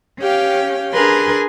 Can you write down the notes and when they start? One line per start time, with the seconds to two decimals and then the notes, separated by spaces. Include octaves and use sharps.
0.19 C#4 G4 F5 G5
0.93 D4 G#4 A#4 B4 G#5 C6